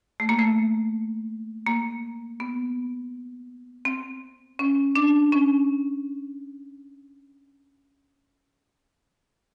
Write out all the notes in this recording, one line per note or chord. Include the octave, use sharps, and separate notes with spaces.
A3
A#3
A3
A#3
B3
C4
C#4
D4
C#4